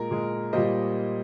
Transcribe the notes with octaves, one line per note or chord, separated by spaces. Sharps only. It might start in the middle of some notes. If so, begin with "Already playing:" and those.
Already playing: A#2 G#3 A#4
A#2 G#3
A#2 G3 A#3 C5 D#5